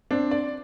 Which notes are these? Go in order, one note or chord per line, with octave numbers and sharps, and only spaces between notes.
C4 D4
D5